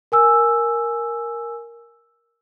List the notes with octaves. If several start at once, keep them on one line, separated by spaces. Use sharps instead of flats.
A#4 G#5 E6